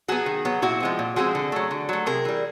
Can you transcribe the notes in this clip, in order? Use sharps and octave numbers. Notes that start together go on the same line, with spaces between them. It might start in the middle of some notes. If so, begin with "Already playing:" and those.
F#3 B3 F#4 G#4
D#3
F#3 B3
A#2 E4 F#4
F3 G#3 C4
A#2
F3 G#3 C4 F#4 G#4
D3
F#3 A3
D3
F#3 A3
C3 G#4 A#4
E3 G3